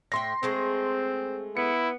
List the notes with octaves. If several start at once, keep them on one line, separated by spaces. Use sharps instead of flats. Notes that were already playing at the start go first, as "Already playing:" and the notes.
A2 E5 G5 C6 A#6
G#3 A3 C4 G#4
B3 E4 C#7